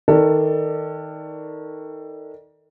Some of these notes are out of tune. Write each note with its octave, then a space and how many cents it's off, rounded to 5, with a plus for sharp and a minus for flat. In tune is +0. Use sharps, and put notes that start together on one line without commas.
D#3 +20 A4 +25 D5 +5